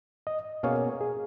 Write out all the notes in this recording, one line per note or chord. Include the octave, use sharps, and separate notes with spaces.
D#5
B2 A#3 C#4 G#4 C#5 F5
G#4